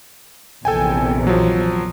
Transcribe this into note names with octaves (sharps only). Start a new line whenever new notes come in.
A#1 E2 C3 A4 G5 G#5
F3 F#3